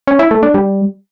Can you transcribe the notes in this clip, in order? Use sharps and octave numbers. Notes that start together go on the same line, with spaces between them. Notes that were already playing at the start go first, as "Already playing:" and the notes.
C#4
E4
A3
D4
G3